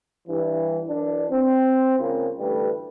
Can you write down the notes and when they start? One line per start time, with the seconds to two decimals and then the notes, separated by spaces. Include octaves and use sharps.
0.28 G2 E3
0.88 F#2 E3 D4
1.30 C4
1.99 G#2 C#3 A#3 C4 F4
2.39 A1 D2 G3 A3 B4